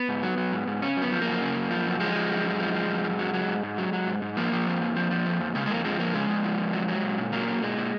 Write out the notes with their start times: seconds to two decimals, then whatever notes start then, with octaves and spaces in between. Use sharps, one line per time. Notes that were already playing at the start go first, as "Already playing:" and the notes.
Already playing: B3
0.09 G#2
0.23 F#3
0.37 F#3
0.53 G#2
0.67 G#2
0.82 C#3 C#4
0.97 F#2
1.02 B3
1.12 F3
1.22 A#3
1.27 F#2
1.41 C#3
1.56 F#2
1.71 F3
1.86 F#2
2.00 F3 G#3
2.15 F3
2.30 F#2
2.45 F#2
2.60 F3
2.74 F3
2.89 F#2
3.04 F#2
3.19 F#3
3.34 F#3
3.48 G#2
3.63 G#2
3.78 F#3
3.93 F#3
4.07 G#2
4.22 G#2
4.37 F3 A#3
4.52 F3
4.67 F2
4.81 F2
4.96 F3
5.11 F3
5.26 F2
5.41 F2
5.55 C#3 G#3
5.66 G#3
5.70 F2 A#3
5.85 F3 G#3
5.99 F2 A#3
6.14 C#3 G#3
6.29 F2
6.44 F3
6.59 F2
6.73 F#3
6.88 F#3
7.03 A#2
7.18 A#2
7.32 F#3 A#3
7.48 F#3
7.62 A#2 G#3
7.77 A#2